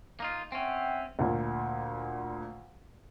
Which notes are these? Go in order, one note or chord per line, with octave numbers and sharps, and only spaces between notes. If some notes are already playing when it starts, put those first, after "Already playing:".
A#3 D#4 F4
C4 C#4 E5 F#5 G5
D2 A#2